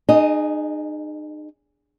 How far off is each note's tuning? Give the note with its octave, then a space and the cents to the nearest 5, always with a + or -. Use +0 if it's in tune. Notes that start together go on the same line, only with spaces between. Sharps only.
D#4 -40 G#4 +0 D#5 +0